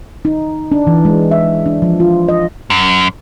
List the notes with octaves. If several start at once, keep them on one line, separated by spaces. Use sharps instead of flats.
D#4
D4
E3
G#3
E5
D4
F3
F4
D#5
F#2